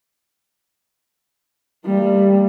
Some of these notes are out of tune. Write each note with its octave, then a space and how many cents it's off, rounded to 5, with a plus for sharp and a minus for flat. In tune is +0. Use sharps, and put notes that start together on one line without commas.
G3 +10 A#3 -40